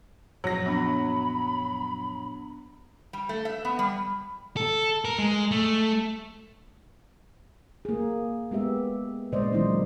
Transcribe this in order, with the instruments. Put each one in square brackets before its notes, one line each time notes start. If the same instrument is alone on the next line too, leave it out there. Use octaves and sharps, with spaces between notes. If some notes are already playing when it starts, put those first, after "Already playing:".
[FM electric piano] F#2 A#2 F3 [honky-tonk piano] F#3 A#6
[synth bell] B3 D4 [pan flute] B5
[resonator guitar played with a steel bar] G3
A3
E5
B3
G3
[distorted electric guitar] A4
A#4
G#3
A3
[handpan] A#3 G#4
G#3 B3 G4 E5
A#2 C#3 G#3 C5 D5 D#5
D#3 E3 F#3 G#3 D#4 E4